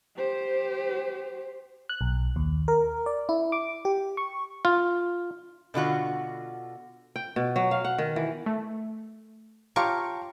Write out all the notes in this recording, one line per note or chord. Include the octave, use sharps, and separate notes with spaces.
G4 C5
F#6
B1
D#2
A#4
D5
E4
D6
G4
C#6
F4
B2 D3 F4 F#4
G5
B2
F#3
F5
F#5
D#3
E3
A3
F4 G4 C#5 F5 A5 A#5 C#6 D7